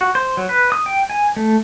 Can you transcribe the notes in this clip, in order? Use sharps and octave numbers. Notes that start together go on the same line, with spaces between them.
F#4
C5
F#3
B4
D#6
G5
G#5
A3